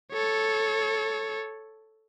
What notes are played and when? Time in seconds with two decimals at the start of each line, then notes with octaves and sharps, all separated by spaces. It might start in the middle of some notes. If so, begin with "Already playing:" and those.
0.13 A4 C#5